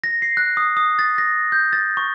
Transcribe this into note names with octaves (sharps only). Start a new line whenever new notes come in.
A#6
C7
F#6
D#6
D#6
A6
A#6
G6
A6
C#6